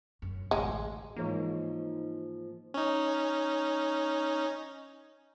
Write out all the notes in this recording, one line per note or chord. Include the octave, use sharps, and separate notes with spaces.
F#2
A1 D2 G#3
G#2 E3 F3 A#3 D#4 G#4 C#5
C#4 D#4